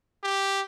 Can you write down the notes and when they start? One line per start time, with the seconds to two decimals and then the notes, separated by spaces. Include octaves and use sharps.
0.24 G4